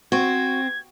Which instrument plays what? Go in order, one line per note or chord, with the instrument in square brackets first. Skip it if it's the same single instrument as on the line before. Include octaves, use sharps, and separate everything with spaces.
[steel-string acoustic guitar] C4 [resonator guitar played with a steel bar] F#4 [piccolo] G#6